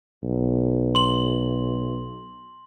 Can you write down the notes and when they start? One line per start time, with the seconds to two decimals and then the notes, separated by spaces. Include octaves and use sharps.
0.23 B1
0.95 C6 F#7